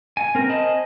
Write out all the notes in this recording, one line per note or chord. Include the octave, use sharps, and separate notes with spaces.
G#5
C4 A#4
C5 D#5 G#5 A5 B5